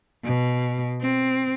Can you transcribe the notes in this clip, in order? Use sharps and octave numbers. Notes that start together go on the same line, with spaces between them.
B2
C4